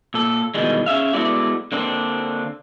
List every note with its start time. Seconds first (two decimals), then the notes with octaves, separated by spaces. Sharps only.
0.14 A#2 A4
0.54 B2 D#3 E3 G3 G#3
0.86 C#4 G#4 E5 F5
1.14 G#3 A3 B3 E4 F#4 D5
1.72 D3 A#3 C4 D4